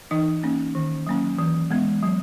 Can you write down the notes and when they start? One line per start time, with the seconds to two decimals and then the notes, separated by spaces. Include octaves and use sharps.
0.11 E3 D#4 D#5
0.43 A#3 C#4
0.75 D#3
1.07 F#3 A#3 C#4
1.39 E3
1.71 G#3 B3
2.03 F#3